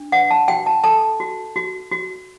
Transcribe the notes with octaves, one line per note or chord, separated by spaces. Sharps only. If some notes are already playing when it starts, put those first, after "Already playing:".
Already playing: D4
B4 F#5
A5
F#4 G5
A5
A4 A5
F#4
F#4
F#4